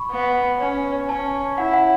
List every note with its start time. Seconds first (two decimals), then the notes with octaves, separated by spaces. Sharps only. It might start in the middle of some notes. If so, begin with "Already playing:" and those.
Already playing: B5 C#6
0.11 B3
0.59 C#4
1.09 C#4 A5
1.58 E4 F#5
1.73 F#5